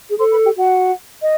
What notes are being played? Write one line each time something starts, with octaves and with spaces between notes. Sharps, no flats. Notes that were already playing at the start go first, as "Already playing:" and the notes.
G#4
A4 C5 C6
B4 B5
G4 G5
F#4 F#5
D#5